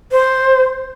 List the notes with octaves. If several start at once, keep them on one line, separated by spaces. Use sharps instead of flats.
C5